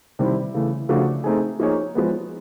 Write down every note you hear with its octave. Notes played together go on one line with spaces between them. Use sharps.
C3 D#3 G3 C4 E4
C#3 E3 A3
C#3 F3 A3 D4 F#4
A3 C4 D#4 G#4
F3 A#3 D#4 G#4 C#5
F3 G#3 B3